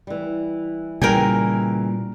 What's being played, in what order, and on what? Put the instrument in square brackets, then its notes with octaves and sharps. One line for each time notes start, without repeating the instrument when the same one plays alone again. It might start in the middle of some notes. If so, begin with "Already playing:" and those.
[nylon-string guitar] E3 G3
[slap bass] A#2 G3 [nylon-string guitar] C#3 E3 [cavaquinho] A#4 G5 G#5